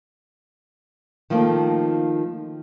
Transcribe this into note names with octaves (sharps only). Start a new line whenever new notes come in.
D#3 F3 A3 A#3 C4 D#4